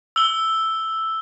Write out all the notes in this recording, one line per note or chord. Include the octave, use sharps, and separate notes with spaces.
E6 G7